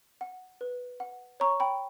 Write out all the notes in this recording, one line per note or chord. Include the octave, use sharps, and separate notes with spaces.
F#5
B4
F#5
C#5 A#5 C#6
G5 B5